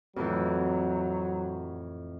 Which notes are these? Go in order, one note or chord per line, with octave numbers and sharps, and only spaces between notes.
F2 A2 E3 F#3